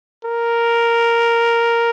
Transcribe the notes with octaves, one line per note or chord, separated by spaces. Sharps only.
A#4